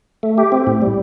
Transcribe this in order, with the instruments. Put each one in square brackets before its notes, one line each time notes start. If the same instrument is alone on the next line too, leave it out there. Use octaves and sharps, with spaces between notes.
[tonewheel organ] A3
G4
C4
A2
G3